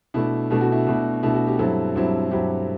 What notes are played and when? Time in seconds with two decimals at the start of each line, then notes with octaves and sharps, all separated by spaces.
0.14 B2 A3 D4 E4
0.50 B2 A3 D4 E4
0.61 F#4
0.72 E4
0.87 B2 A3 D4
1.23 B2 A3 D4 E4
1.35 F#4
1.47 G4
1.59 G2 F#3 C4 E4 A4
1.95 G2 F#3 C4 E4
2.31 G2 F#3 C4 E4 G4